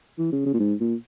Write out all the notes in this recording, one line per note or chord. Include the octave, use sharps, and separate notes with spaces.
E3
C#3
C#3
A#2
G#2
A#2